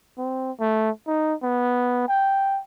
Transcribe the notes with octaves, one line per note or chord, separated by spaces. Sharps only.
C4
A3
D#4
B3
G5